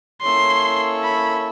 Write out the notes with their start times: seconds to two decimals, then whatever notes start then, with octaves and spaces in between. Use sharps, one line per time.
0.22 A#3 C#4 E4 A4 C#5 C6
1.04 B5